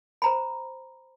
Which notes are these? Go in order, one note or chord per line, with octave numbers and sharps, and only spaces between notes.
C5 A#5 B5